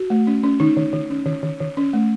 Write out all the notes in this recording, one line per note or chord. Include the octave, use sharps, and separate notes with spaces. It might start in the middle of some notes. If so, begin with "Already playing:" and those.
Already playing: F#4
A3
C#4
C#4
D#3 D#4
D#3
D#3
C#4
D#3
D#3
D#3
C#4
A3